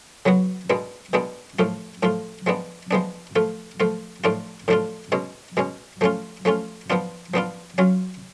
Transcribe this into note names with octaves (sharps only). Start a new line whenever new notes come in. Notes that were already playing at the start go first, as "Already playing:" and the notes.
C#3 F#3 B3 F#4
B2 G#3 B3 D4
B2 G#3 B3 D4
A2 F3 A3 F4
A2 F3 A3 F4
F3 G#3 B3 D4
F3 G#3 B3 D4
F3 A3 F4
F3 A3 F4
A2 F3 A3 D4 F4
A2 F3 A3 D4 F4
B2 G#3 C#4
B2 G#3 C#4
F3 A3 C#4 F4
F3 A3 C#4 F4
F3 B3 D4 F4
F3 B3 D4 F4
F#3 C#4 F4